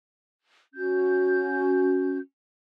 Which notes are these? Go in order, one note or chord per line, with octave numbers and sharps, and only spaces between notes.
C#4 F#4 G6